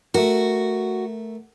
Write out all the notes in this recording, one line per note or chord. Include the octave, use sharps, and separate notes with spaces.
A3 F#4 A#4